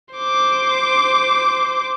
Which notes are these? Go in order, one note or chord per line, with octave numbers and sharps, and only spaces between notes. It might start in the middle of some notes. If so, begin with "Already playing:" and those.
C5 D6